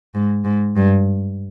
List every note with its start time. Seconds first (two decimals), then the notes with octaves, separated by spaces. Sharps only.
0.14 G#2
0.45 G#2
0.76 G2